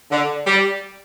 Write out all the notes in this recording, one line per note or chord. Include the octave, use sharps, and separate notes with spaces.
D3
G3